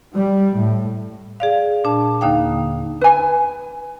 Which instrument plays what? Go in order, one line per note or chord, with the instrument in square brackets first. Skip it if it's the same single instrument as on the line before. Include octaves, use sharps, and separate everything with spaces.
[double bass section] G3
A2
[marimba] G#4 D5 F5
A#2 D4 A5
D#2 D3 A#3 D#4 F5 G5
[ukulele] B4 G#5